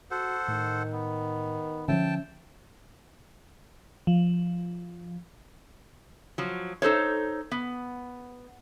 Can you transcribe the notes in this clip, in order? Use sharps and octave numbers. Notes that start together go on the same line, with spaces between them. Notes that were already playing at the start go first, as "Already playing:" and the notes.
F#4 A4 C5 F#5
A2 D#3
B3
D3 E3 F3 C#4 E5 G5 A5
F3
F3 F#3
D#4 A4 C5 C#5
B3